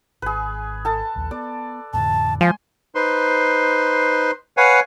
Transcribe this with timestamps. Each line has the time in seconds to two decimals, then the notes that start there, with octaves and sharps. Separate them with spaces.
0.22 G#1 G#4 B4
0.85 A4 A5
1.15 A#1 D#2
1.31 B3 D5
1.93 F2 A2 D3 A5
2.41 F3 G#3 F5 G#5 C6
2.95 D#4 B4 C5 C6
4.57 B4 C#5 F5 F#5 G#5